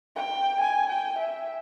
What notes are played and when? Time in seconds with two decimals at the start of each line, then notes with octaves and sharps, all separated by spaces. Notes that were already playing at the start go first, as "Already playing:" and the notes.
0.16 G5
0.60 G#5
0.89 G5
1.18 E5